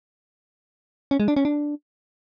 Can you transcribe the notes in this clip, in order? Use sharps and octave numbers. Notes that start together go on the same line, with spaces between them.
C#4
G#3
D4
C#4
D4